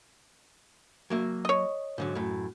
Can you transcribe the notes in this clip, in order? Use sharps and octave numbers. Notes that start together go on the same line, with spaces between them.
F#3 A#3 E5
C#5 D#5
G#2 D3 F#3
F#2 A2